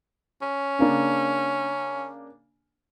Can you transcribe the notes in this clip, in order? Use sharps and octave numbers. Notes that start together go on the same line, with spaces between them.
C#4
C#3 A#3 D4